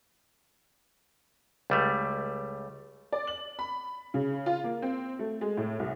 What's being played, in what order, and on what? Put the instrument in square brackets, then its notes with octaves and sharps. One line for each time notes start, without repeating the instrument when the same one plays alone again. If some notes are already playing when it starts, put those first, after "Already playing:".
[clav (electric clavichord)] C#2 G3 A3
[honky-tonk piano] D5
F#7
B5
C#3
F4
A#3
C4
A3
G#3
A2
C2